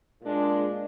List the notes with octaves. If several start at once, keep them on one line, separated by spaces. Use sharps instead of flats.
A#2 G#3 D4